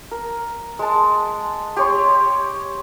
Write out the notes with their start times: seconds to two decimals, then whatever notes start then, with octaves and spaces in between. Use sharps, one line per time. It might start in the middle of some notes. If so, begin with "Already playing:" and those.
0.11 A#4
0.79 G#3 A5
1.76 G4 C#5 C6